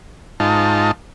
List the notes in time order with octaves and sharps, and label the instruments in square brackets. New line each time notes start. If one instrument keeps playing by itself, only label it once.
[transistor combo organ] G#2 D#4 F4 A5